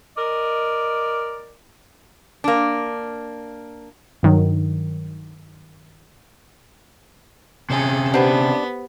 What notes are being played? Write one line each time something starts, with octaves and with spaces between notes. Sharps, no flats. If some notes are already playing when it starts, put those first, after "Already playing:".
A#4 D5 D#5
A#3 D4
G2 D#3 F#3
C3 C#4 G#4 A4
B3 D4 G4 B4 C5 F#5